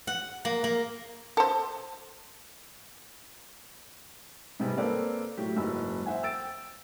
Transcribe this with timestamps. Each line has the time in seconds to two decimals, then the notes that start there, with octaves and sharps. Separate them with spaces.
0.07 F#5
0.45 A#3
0.64 A#3
1.37 A4 C5
4.60 G#2 C3 G3 G#3 B3 C4
4.77 A#3 C4 A4 B4 D5
5.37 A2 F#3 G4
5.56 F#1 G#2 E3 F#3 E6
6.06 C5 E5 F#5 G#5
6.23 G5 E6 A6 D7